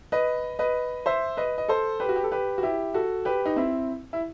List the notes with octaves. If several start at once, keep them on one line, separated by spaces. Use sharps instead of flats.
B4 D#5
B4 D#5
C5 E5
B4 D#5
D#5
A4 C5
G4 B4
F#4
G4
A4
G4 B4
F#4
E4 G4
F#4 A4
G4 B4
D#4
C4 E4
E4